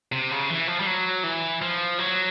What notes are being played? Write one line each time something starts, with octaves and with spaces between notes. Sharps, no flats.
C3
C#3
E3
F3
G3
F#3
E3
F3
F#3